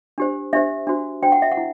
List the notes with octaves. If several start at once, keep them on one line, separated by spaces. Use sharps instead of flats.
D4 G4 C5
D4 G4 C5 E5
D4 F#4 C5
D4 F#4 C5 G5
F#5
E5
F#5
E4